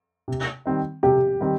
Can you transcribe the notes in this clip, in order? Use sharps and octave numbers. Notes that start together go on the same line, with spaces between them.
C3
D#3 G3 C4 D#4
C3 G4
D#3 G3 C4 D#4